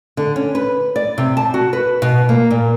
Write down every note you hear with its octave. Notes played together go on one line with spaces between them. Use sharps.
D3
C#4
B4
D5
C3
A5
F#4
B4
B2
A#3
A#2